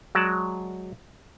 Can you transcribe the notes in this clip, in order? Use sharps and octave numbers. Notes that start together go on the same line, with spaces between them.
F#3 G#3 D5 A5